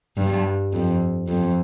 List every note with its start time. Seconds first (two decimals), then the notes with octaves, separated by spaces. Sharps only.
0.17 G2
0.73 F2
1.28 F2